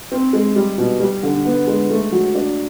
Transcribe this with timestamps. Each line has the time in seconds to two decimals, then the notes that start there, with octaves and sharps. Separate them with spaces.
0.12 C4
0.33 G#3
0.56 G3
0.78 B2
1.00 G3
1.23 D3
1.45 B3
1.67 G#3
1.90 A3
2.12 F#3
2.35 D4